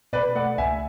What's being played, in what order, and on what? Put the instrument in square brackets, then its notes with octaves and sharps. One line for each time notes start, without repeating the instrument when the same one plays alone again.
[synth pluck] B2 [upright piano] B4 D5
[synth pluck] A3 [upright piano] D5 F#5
[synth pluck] C#2 [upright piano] E5 G#5